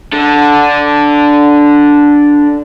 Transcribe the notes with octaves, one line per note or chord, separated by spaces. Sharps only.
D4 A4